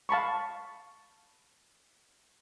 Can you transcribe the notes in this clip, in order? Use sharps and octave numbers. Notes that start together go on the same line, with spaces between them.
F5 A5 B5 C#6